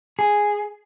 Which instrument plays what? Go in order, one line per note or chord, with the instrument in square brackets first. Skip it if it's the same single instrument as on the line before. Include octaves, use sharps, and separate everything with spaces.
[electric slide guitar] G#4